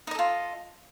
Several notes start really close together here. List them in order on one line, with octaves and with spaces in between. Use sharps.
D#4 D#5 A4 F4